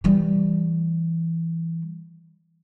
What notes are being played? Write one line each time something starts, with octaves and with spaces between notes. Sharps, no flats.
E3 G3